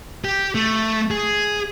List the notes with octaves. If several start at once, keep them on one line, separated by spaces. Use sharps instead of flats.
G4
A3
G#4